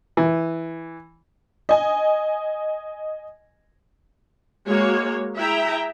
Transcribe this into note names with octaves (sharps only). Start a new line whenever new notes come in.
E3
D#5 G#5
G#3 A#3 F#4 C#5
E4 G#4 E5 G5 A#5